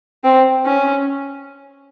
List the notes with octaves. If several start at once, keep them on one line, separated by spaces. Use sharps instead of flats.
C4
C#4